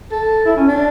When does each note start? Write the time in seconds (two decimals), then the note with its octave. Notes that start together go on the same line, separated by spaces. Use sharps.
0.12 A4
0.45 E4
0.56 C#4
0.68 D4